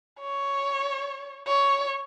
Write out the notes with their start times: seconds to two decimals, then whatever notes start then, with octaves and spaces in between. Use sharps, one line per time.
0.19 C#5
1.47 C#5